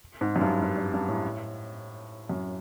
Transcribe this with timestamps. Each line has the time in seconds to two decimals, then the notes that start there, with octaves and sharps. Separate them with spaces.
0.21 G#2
0.36 F#2
0.41 G2
0.62 G2
0.77 G2
0.94 G2
1.08 A2
2.29 F#2